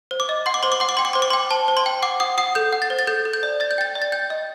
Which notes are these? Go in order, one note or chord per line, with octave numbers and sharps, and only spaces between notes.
C5
D6
D#5
F#5 C6
D6
C5 C6
D6
F#5 C6
D6
G5 C6
D6
C5 C6
D6
C6
G5
C5 A5
C5
C6
G5
F#5 D6
F#5 D#6
F#5 D#6
A4 G6
F#5
A6
C5
A6
A4 G6
A4
G6
D5
D5 A6
G6
G5 A6
D5
A6
G5 G6
D#5